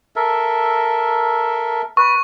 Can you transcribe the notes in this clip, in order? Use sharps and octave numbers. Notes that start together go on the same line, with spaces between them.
A4 A#4 E5
B4 C#6